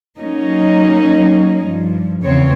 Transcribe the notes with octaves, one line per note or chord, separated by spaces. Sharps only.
F#3 A#3 C#4 D#4
G2 F3
E2 C#3 C4 C#5